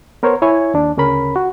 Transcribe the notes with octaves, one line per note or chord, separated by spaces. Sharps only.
B3 A#4 C5 C#5
E4 C#5 G#5
D#2 D4
D2 C#3 C#4 A#4 B5
F#4